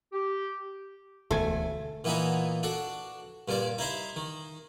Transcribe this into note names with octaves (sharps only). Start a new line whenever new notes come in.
G4
E1 D2 A3 G#5
A#2 E3 B3 D#4 D#5 E5
D4 F#4 A4
G2 A#2 G3 D5
D#4 E4 C5 E5
D#3